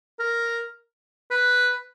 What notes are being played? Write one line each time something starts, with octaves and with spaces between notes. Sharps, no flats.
A#4
B4